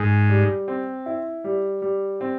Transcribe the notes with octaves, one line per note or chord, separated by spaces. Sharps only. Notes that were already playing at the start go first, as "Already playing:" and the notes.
Already playing: G#2 G#4
G3
C4
E4
G3
G3
C4